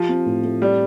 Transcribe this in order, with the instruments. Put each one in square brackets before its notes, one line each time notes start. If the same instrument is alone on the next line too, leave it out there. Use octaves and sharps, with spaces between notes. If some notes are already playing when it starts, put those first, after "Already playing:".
Already playing: [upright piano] F3 [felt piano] G4
[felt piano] C4
A2
A3
[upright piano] G3 [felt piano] G4